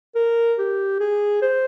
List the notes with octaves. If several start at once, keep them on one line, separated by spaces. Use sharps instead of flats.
A#4
G4
G#4
C5